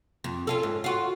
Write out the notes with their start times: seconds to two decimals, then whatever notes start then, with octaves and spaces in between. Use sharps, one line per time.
0.24 F2
0.47 C#4 F4 A4
0.63 G#2
0.84 F4 F#4